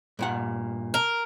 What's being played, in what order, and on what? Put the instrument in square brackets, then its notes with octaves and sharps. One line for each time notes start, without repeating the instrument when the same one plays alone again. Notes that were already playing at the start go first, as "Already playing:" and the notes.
[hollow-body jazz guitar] G2 A#2 F#5
[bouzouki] A#4